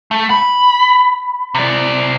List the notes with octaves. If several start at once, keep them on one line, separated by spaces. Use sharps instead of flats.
A3
B5
C3 D5